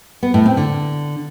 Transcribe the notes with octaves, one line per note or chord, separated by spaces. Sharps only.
B3
A2
C4
D3